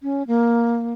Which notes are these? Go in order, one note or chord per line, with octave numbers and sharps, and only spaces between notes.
C#4
A#3